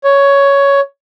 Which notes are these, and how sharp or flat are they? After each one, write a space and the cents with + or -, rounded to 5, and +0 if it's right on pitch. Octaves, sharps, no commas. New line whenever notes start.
C#5 +10